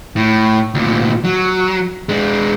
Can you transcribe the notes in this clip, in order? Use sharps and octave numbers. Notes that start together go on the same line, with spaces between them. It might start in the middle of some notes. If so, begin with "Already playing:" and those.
A2
D2 A#2
F#3
G#3 D4